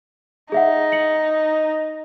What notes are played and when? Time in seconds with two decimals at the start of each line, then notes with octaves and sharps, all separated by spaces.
0.52 D#4 G#4 E5 F#5
0.92 C#7 F#7